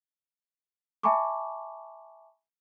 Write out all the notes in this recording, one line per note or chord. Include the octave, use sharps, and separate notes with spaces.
E5 G#5 A5 B5 C#6 D6